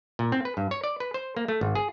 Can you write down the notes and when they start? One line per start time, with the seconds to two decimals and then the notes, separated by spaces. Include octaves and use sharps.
0.19 A#2
0.32 C4
0.45 B4
0.57 G2
0.71 C#5
0.84 D5
1.00 B4
1.14 C5
1.37 A#3
1.48 A3
1.61 G#1
1.75 G#4